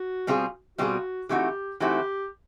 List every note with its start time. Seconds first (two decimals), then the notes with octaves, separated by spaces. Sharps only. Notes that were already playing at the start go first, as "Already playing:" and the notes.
Already playing: F#4
0.27 B2 G3 C4 F4 G#4
0.78 B2 G3 C4 F4 F#4 G#4
1.29 E3 A3 C4 D#4 F#4 G4
1.80 E3 A3 C4 D#4 F#4 G4